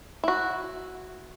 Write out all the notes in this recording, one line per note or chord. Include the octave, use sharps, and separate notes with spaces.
E4 F#4